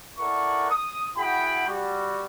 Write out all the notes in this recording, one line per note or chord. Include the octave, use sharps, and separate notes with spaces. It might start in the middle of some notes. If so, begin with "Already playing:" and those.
E4 A4 A#4 D5 F#5 C#6
D#6
E4 F#4 G#4 F#5 G5 B5
G3 F#4